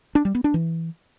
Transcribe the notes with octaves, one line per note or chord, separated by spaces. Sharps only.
D4
G3
B3
D4
E3